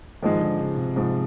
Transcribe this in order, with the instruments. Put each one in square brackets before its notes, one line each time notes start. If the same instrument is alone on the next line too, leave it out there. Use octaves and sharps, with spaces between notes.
[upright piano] G#2 F3 G#3 [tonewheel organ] D#3
[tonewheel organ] D3
C#3
C3
[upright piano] G#2 F3 G#3